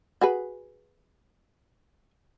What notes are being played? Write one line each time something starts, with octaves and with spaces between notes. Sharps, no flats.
F#4 G#4 B4